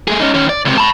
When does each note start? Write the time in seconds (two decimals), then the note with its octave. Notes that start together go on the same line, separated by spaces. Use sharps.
0.08 A3 G#4
0.20 C#4 D#4
0.34 D#3 C#4
0.49 D5
0.65 C#2 C3
0.78 A5 B5